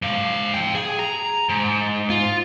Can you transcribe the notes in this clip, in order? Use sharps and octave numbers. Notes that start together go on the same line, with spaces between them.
G#2 F5
F5 G5
G#4
A#5
G#2
F4